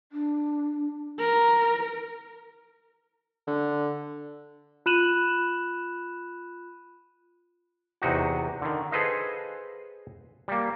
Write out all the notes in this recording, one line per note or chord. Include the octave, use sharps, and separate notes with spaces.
D4
A#4
D3
F4 B5 F#6 D#7 E7 F#7
E2 C3 D#4 F#4
D3 D#3
G#4 A4 B4 C5 D#5 F5
G3 A#3